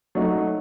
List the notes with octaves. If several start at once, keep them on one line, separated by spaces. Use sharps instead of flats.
F#3 A3 D#4